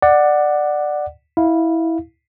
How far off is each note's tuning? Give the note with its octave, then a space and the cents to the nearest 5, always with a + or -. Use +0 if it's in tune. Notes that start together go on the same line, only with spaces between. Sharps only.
D5 +15 F#5 +0
E4 -15 F5 +0